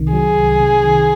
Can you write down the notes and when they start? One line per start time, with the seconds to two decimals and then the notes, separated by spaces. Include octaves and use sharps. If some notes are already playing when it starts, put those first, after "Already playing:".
Already playing: C2 C3 D#3
0.13 F#3 G#4
0.37 C2
0.60 C3
0.84 D#3